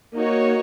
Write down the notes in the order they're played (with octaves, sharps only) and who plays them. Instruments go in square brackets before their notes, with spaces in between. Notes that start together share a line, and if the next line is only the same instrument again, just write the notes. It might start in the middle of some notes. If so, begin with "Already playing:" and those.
[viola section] A#3 D#4 F#4 C#5